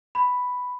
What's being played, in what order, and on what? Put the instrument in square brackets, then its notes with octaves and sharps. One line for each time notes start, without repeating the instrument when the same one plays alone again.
[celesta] B5